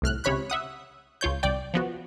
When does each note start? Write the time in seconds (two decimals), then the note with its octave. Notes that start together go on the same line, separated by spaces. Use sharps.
0.02 C2 A2 F6 F#6
0.24 C#2 C3 C#5 B5 F#6
0.50 E5 F#5 D#6
1.21 C#2 F4 C#5 G6
1.43 C2 D5 G5
1.74 F3 B3 F#4